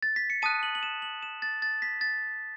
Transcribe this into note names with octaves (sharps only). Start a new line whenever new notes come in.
A6
B6
C#7
A5 D#6 F#6 D#7
F#7
F#7
E7
F#7
E7
A6
A6
B6
A6